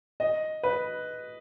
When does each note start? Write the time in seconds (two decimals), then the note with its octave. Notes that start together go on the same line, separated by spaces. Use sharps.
0.20 D#5
0.63 B4